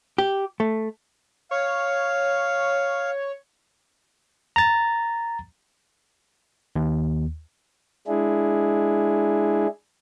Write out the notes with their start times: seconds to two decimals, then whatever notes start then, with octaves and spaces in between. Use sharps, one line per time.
0.18 G4
0.60 A3
1.51 C#5 F5
4.56 A#5 A6
6.76 D#2
8.07 G#3 D4 E4 G#4